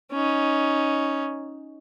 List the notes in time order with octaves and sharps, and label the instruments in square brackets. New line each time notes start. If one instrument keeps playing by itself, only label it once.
[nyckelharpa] C#4 D#4